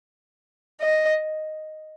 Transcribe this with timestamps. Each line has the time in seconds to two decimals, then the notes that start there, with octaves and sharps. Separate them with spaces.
0.81 D#5